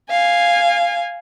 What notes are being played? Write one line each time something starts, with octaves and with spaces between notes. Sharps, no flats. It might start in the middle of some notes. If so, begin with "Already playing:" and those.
F5 G#5